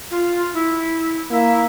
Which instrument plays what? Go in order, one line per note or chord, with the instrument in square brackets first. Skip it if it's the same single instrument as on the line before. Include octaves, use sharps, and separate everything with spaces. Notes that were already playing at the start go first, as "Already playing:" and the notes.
[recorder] F4
E4
[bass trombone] A#3 [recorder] E4